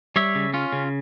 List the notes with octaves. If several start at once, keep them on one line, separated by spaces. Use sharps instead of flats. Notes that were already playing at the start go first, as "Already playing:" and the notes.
G3 C#5 E5
C#3
C#4 F4
C#3